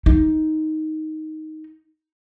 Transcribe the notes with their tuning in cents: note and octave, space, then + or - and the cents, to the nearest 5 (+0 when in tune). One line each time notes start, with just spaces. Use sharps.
D#4 +5